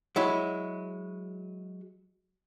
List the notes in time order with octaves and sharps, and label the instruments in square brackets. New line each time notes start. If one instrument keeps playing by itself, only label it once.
[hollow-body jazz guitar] F#3 G#3 E4